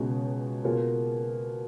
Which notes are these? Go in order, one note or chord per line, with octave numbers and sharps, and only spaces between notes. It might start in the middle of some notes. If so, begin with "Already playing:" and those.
Already playing: C#2 B2 G#3 C#4 G#4
B2 A#3 F4 G#4